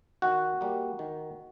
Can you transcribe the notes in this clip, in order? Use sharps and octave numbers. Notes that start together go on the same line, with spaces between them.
D#3 F#4
G3 A#3
D#3